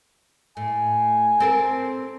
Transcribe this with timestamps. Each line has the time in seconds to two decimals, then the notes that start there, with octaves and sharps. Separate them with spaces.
0.57 A2 G#5
1.40 C4 A4 A#4